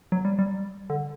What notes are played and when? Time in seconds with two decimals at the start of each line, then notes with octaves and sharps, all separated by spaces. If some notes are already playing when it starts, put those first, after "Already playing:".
0.12 F#3
0.25 G3
0.39 G3
0.90 D3